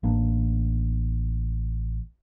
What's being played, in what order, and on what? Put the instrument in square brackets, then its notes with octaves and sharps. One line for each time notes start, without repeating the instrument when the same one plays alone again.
[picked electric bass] A1 A#3 D4